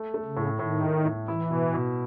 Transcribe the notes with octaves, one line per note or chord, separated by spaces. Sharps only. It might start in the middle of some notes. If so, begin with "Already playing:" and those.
Already playing: A3
A3
C#3
A2
A2 D#3
A2
A2
E3 E4
B2
B2